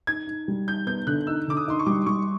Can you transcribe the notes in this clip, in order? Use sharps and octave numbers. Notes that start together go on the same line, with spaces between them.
D#4 G#6
D#4
G3
D#4 G6
B3 G6
D3 F#6
D#4 E6
D3 D6
D#6
D#4 C6
C#6
G3 D6
G3 C#6